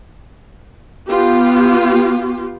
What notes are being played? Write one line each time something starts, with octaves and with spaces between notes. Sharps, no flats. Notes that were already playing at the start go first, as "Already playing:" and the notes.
B3 F4 G4